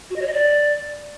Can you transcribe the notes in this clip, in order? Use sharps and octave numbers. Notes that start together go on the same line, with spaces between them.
F#4
D#5
C#5
D#5
D5